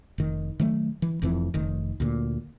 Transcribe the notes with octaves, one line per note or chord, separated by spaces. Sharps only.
F1 D#3
D#3 F#3 A3
E3
F1 F2 E3 C4
F1 D#3
D2 A#2